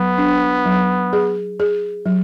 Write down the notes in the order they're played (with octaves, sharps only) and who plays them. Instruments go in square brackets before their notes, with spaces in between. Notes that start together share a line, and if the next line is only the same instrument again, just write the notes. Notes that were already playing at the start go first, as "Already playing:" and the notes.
Already playing: [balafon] F#3 [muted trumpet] B3
[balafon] D4
F#3
G#4
G#4
F#3